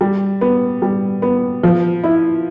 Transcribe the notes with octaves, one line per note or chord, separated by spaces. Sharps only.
G3
B3
G3
B3
F3
E4